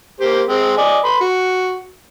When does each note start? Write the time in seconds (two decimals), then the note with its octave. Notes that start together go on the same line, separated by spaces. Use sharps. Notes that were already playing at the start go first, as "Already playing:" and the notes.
0.20 A#3 G4 C5
0.49 G#3 C4
0.78 D5 D#5 G#5
1.04 B4 B5 C6
1.20 F#4